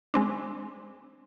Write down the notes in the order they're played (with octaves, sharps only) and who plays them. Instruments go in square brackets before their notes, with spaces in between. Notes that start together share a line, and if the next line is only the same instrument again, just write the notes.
[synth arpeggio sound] G#3 C4 D4